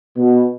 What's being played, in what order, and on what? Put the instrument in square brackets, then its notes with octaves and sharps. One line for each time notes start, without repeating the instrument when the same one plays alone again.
[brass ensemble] B2